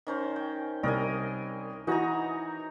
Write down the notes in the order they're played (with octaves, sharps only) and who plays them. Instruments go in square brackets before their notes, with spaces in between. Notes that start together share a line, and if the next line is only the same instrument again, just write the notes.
[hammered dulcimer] D#3 C#4 C5
G5
[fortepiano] C2 [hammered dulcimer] A#4 D#5 G#5
[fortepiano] E3 F#4 [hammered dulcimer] D#4 G#5 A#5